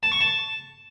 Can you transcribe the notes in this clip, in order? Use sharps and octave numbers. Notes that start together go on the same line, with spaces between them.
A5
C#6
A5